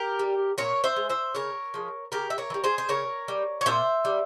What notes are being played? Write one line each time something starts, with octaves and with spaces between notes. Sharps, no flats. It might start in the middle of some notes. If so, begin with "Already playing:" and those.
Already playing: G4 A#4
G3
A#2 A#4 C#5
C5 E5
G#3
C5 E5
C#3 A#4 C#5
F3 G#3
C#3 G4 A#4
E5
A#4 C#5
E3
G3
G#4 C5
C5
C#3 A#4 C#5
G3
C#5
A#2 C5 E5
G3